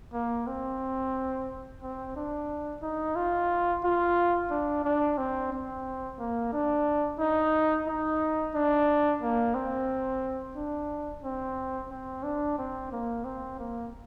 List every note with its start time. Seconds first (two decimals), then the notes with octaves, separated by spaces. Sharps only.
0.13 A#3
0.47 C4
1.82 C4
2.16 D4
2.82 D#4
3.16 F4
3.84 F4
4.50 D4
4.84 D4
5.18 C4
5.52 C4
6.18 A#3
6.53 D4
7.19 D#4
7.87 D#4
8.54 D4
9.22 A#3
9.54 C4
10.55 D4
11.23 C4
11.90 C4
12.23 D4
12.58 C4
12.92 A#3
13.24 C4
13.59 A#3